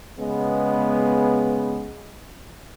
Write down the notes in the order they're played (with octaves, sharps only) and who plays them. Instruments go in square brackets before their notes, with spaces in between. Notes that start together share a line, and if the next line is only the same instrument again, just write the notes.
[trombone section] C#3 G#3 B3